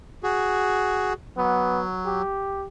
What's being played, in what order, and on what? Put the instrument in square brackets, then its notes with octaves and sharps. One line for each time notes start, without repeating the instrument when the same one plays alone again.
[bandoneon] F#4 G#4
[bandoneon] F#3 [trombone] B3
[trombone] G4